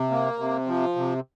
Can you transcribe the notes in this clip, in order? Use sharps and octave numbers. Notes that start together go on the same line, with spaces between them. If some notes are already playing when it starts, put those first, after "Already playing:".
Already playing: C3
A#3
C3
F3
C3